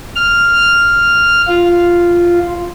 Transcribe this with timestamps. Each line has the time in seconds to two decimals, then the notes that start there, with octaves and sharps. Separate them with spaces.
0.16 F6
1.47 F4